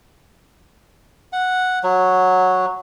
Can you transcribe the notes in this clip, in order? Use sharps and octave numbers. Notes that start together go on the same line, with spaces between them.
F#5
F#3